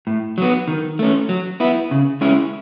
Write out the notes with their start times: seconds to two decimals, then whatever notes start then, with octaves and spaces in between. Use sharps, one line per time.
0.07 A2
0.38 F#3 B3
0.68 D#3
0.99 A3 C#4
1.29 F#3
1.60 B3 E4
1.91 C#3
2.21 G#3 C#4 E4